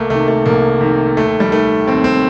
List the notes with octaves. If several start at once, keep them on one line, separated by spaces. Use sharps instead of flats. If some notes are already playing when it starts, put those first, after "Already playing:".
Already playing: C2 A3 A#3
C3 D#3 A3
A3
C2 A#3
C3 D#3
D#2 A3
G3
D#3 A3
D#2 C4
C4